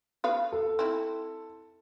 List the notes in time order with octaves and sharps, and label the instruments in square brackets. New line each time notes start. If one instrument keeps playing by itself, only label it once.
[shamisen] B3 B4 F5
[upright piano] A4
[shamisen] C4 E4